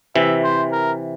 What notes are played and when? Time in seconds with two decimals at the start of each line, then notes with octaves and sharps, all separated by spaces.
0.15 C3 E3 E5
0.44 C5
0.72 A#4